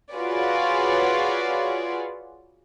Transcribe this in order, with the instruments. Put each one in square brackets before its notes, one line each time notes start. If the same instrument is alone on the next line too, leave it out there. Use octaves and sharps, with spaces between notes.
[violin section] F4 F#4 G#4 B4 C#5 D5